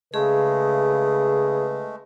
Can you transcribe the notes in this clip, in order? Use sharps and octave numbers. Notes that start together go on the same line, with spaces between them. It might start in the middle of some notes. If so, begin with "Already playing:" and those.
C#3 G#3 A3 G#4 B4